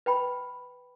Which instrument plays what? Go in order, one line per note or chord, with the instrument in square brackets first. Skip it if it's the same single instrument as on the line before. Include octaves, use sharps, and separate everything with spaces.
[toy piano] B4 G5 B5